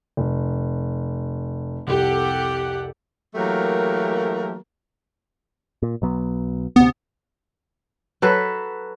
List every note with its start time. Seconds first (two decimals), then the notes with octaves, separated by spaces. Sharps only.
0.17 F1
1.87 C2 F2 G4 A4 F#5
3.35 E3 F#3 A3 A#3 G4 A#4
5.83 A#2
6.02 B1 F#3 B3
6.76 D2 C3 B3
8.22 F#3 A4 B4